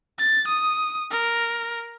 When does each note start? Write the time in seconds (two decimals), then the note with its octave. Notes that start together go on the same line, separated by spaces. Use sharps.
0.19 A6
0.48 D#6
1.11 A#4